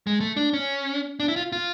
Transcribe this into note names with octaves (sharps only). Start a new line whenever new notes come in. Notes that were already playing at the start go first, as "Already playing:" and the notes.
G#3
A3
D4
C#4
D4
E4
F4
F4